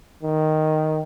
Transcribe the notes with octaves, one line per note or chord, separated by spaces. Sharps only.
D#3